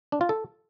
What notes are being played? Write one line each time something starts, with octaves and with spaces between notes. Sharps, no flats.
D4
F4
A4